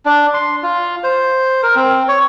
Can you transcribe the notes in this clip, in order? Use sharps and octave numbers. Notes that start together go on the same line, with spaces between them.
D4
C6
F4
C5
A#4
C4
C#5